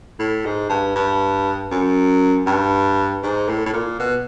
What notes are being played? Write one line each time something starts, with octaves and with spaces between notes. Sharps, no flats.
A2
G#2
G2
G2
F#2
G2
G#2
A2
A2
A#2
B2